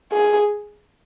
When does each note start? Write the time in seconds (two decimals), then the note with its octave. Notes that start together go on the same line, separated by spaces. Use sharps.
0.12 G#4